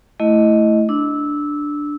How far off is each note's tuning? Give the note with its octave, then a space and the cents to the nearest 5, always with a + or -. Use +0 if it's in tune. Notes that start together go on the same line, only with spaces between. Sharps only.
A3 +0 E4 +0 D#5 +5
D4 +0 E6 -15